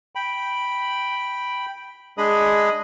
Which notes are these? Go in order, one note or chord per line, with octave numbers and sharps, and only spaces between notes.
G5 B5
G#3 D4 G#4 D#5 B5 D#6